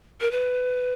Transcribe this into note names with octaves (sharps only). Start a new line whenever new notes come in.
A#4
B4